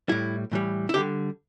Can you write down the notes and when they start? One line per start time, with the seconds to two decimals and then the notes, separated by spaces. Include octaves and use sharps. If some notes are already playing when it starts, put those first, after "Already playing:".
0.09 A2 G3 E4
0.52 A2 E3 G3
0.89 E4
0.94 D3 G3 G4